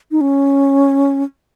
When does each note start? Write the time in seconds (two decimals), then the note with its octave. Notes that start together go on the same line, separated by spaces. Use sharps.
0.11 D#4
0.21 C#4